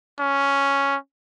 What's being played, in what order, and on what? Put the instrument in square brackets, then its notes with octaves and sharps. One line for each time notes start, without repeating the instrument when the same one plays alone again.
[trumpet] C#4